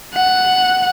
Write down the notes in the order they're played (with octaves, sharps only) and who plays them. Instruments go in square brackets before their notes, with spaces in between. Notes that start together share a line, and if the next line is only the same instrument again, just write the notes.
[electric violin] F#5